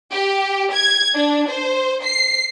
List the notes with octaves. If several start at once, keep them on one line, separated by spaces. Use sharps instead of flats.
G4
G#6
D4
C5
C7